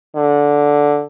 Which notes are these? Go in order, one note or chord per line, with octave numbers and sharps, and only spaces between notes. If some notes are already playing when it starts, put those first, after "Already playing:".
D3